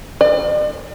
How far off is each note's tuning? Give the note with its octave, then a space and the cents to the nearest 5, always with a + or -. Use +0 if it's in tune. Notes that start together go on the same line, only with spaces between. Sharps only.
D5 +40